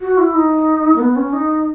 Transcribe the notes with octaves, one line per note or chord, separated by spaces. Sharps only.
F#4
E4
D#4
A#3
B3
C#4
D#4